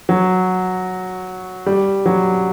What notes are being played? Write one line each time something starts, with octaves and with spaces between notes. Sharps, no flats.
F#3
G3
F#3